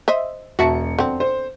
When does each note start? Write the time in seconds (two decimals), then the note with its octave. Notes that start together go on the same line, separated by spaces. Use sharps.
0.08 C5 D#5 E5
0.59 E1 F#4 E5 A5 C#7
0.99 F2 D3 C4
1.20 C5